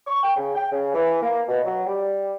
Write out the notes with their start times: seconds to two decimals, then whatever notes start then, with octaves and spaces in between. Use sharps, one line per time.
0.07 C#6
0.23 G5
0.36 C#3
0.55 G5
0.72 C#3
0.95 E3
1.22 A#3
1.48 B2
1.64 F#3
1.87 G3